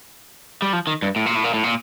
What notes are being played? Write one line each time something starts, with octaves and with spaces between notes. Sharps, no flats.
G3
F3
D#3
G2
A2
A#2
A2
A#2
A2
A#2